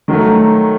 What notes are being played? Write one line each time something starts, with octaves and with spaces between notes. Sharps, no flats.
D#3 F#3 A3